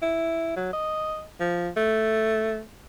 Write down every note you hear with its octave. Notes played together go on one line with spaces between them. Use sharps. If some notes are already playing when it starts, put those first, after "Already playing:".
E4
F#3
D#5
F3
A3